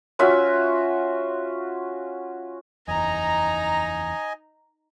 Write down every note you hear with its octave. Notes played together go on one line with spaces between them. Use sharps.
C#4 F4 F#4 E5
F#1 E2 D#4 D#5 G#5 A#5